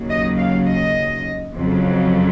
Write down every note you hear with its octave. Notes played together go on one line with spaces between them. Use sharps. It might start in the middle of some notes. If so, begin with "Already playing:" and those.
Already playing: D#2 C#3 F#3
D#5
F5
D#5
F2 C#3 F#3